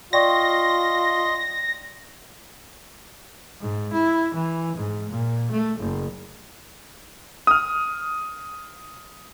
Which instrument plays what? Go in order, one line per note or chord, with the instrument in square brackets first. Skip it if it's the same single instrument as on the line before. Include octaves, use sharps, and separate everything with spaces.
[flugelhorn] F4 [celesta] D5 G5 C#6 [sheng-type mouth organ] D#5 C6 [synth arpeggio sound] A#6
[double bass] G#2
E4
E3
G#2
A#2
A3
F#1
[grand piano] D#6 F6